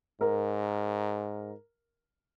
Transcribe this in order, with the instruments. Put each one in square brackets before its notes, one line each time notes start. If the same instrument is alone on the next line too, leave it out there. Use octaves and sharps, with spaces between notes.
[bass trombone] G#2 [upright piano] A#4